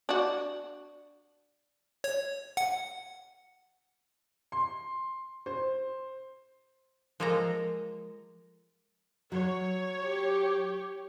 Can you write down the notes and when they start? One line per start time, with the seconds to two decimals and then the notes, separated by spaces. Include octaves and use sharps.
0.09 D4 F#4
2.04 C#5
2.57 F#5
4.52 C6
5.46 C5
7.20 F3 G#3 A#3 A4 G#5 A#5
9.32 F#3 C#5
10.05 G4